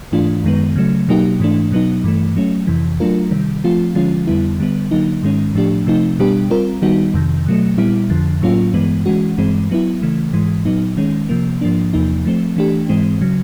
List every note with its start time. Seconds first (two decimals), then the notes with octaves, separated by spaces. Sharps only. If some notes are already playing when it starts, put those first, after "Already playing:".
0.12 G#2 E3 A3 D4 F4
0.44 F#2 D#3 G#3 B3
0.76 C#3 F#3 A3
1.09 B2 F#3 A#3 D#4 G4
1.40 G#2 E3 A3 D4
1.72 B2 F#3 B3 D#4
2.04 G2 E3 A3
2.36 F#3 A3 C#4
2.67 F2 C3 E3
3.00 F#3 A3 D4 F4 A#4
3.31 C3 D#3 G3
3.64 F3 A3 C4 F4
3.95 D3 F3 G#3 C#4 F4
4.27 F2 D3 G3 B3 E4
4.59 D3 G3 B3
4.91 D3 F#3 A#3 D#4
5.23 G#2 D#3 G#3 C#4
5.55 A2 F3 A3 D4 G4
5.86 C3 F3 A3 C4 D#4
6.19 B2 G3 B3 D4 G4
6.50 G3 C4 F4 A#4
6.82 D#3 G3 B3 D#4 F#4
7.14 F2 C3 D#3
7.46 B2 F#3 A3
7.78 A#2 G3 B3 E4
8.10 F2 D3 F3
8.42 A2 F#3 A#3 C#4 F4
8.74 G2 E3 G#3 B3
9.06 E3 G#3 C#4 F#4
9.38 G2 E3 G#3 C4
9.70 F#3 B3 E4
10.02 C#3 E3 A3
10.33 G#2 E3 G#3
10.65 A#2 F#3 B3 D#4
10.97 D#3 G#3 C#4
11.29 C3 F3 A#3
11.61 G#2 F3 A#3 D4
11.93 E2 C3 F3 A#3 D#4
12.25 F3 A3 C4
12.56 E3 A3 D4 G4
12.89 G#2 E3 G#3 C4
13.21 C#3 F#3